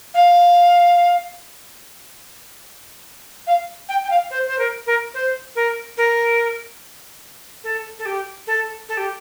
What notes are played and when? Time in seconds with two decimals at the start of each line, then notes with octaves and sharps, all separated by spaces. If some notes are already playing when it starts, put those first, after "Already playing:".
0.14 F5
3.47 F5
3.89 G5
4.04 G5
4.10 F5
4.30 C5
4.47 C5
4.58 A#4
4.86 A#4
5.14 C5
5.55 A#4
5.97 A#4
7.64 A4
7.99 A4
8.05 G4
8.47 A4
8.89 A4
8.97 G4